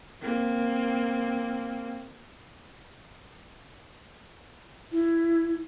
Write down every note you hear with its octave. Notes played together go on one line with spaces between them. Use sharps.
A#3 C4
E4